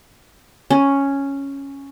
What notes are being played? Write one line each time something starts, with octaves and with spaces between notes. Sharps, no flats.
C#4